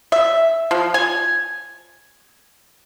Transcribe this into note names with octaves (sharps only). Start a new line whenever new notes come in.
E5
F3
G#5